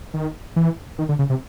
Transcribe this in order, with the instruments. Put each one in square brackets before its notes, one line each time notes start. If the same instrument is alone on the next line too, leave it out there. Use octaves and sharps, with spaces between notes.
[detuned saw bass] D#3
E3
D#3
D3
C#3
C3